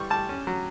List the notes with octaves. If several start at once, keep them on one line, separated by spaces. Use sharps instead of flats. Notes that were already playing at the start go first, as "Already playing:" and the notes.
Already playing: E3 G3 C#6
G3 A5
C#4
F#3